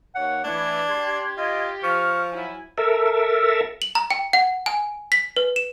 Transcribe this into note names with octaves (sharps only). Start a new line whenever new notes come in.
D#2 C#5 F#5
E3 A3 D4 G#6
G4 C6
F4 D#5
F3 C#6 F6
F#3 E4 G#5
A4 A#4 E5
F#7
A#5
G5
F#5
G#5
B6
B4
E7